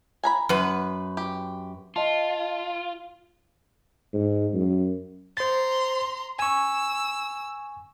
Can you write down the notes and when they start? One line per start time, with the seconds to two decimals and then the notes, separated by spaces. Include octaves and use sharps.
0.23 G#5 A#5 B5
0.49 F#2 B4
1.17 G4
1.96 F4 D#5 A5
4.13 G#2
4.54 F#2
5.37 C5 A#5 C6 A6
6.39 G#5 C#6 E6